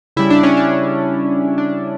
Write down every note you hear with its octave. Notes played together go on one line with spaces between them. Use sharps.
C#3 G3 E4
D4
C#4
D4
D4